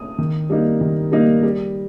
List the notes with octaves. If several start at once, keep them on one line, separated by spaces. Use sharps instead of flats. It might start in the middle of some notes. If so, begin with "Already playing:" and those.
Already playing: D#6
D#3
G3 A#3 D#4
D#3
G3 A#3 D#4
G3